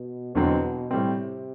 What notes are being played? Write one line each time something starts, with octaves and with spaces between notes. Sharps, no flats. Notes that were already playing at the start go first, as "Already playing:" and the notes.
Already playing: B2
E2 B2 D3 F#3 C4
A2 C3 G3 C4